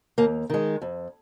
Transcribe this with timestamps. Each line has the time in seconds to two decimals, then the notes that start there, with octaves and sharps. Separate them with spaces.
0.18 D#2 A#3
0.50 D#3 G#3
0.82 F2